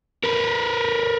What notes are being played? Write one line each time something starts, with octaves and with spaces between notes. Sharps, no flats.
A#4 B4